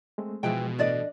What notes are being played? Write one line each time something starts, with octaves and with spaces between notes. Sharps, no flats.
G#3 A3 C4
B2 E3 F3 G#3 E4 B4 G5
A2 E3 D4 A4 D5 D#5